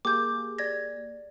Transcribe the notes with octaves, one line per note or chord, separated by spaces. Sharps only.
A#3 G4 G#4 D6 G6
D5 G#6 A#6